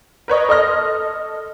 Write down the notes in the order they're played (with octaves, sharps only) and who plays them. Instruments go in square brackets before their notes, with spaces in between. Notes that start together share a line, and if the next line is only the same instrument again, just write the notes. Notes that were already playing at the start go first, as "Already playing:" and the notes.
[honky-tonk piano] A#4 B4 C#5 D#5
A4 D#5 C6 F6 A#6